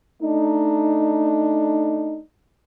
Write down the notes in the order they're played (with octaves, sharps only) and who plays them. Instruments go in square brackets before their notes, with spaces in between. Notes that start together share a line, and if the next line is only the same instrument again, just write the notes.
[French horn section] A3 D4 D#4